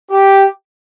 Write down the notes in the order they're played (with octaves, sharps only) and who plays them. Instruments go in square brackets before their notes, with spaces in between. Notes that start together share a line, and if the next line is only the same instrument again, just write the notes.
[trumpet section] G4